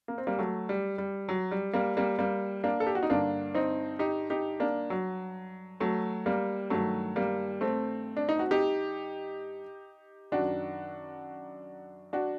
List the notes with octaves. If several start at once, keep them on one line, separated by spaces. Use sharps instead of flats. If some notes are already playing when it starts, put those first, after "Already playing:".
A#3
C4
G3 A#3
F#3 A3
G3
G3
F#3
G3
G3 A#3
G3 A#3
G3 A#3
A#3 D4
A4
G4
F#4
D#4
G2 D3 A#3 D4
C4 D#4
D#4 G4
D#4 G4
A#3 D4
F#3
F#3 A3
G3 A#3
G2 D#3 F#3 A3
G3 A#3
A3 C4
D4
D#4
F#4
D#4 G4
F#2 D#3 D4 F#4
D4 F#4